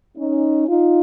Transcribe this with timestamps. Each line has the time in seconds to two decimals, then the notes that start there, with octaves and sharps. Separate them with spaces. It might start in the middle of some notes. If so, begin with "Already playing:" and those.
0.17 C#4 D#4
0.68 D#4 F4